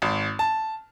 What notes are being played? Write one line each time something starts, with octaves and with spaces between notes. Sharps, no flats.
G#1
A5